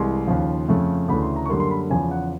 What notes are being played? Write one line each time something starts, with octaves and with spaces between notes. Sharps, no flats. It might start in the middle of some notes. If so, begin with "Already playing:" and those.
Already playing: C2 C3 E3 G#3 C6
D#2 C#3 F3
F2 C#3 F3 A3
D2 C#3 E3 A3 B5
C6
A#5
C#6
F#2 D3 G3 A#3 C6
C6
B5
E2 C#3 F3 G#5
F#5